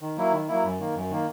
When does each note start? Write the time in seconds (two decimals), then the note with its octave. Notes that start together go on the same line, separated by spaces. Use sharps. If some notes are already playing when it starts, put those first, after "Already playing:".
0.01 D#3
0.17 F#3 A#3 E4
0.32 D#3
0.48 F#3 A#3 E4
0.63 F#2
0.79 D#3 A#3
0.96 F#2
1.10 D#3 A#3